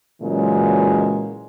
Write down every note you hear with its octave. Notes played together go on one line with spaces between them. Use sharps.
A#2 C#3 E3 F#3 G#3